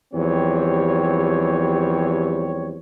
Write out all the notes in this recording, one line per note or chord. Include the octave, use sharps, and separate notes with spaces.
E2 F3 G3 C4 G4 C#5